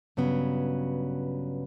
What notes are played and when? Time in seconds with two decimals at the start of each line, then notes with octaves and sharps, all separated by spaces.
0.17 G2 C#3 F#3 B3